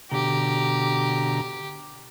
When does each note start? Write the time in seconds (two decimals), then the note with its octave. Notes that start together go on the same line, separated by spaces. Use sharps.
0.11 B2 D3 G4 A#5